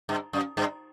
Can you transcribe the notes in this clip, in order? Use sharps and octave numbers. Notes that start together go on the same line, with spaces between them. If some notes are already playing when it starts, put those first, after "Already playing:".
G2
F#2
G2